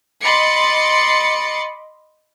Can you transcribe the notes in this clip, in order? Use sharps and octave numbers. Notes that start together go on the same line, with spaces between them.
D#5 B5 C6 D6 A6 C#7